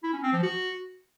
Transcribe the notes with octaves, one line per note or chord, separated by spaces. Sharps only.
E4
C#4
C4
F3
F#4